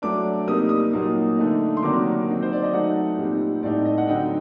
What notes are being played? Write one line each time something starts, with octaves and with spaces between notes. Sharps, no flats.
F#3 A3 D4 D6
C3 G3 A#3 D#4 D#6
D#6
A#2 F#3 A#3 D#4
D3 A3 D#4
C6
C3 D#3 F#3 A#3 D4 D6
F#3 C4 D#4
C5
D5
D#5
F#3 A3 D#4 F#5
A#2 G3 C4 D#4
A2 A3 C4 D#4 D5
D#5
F#5
D3 F#3 C4 D#4 G5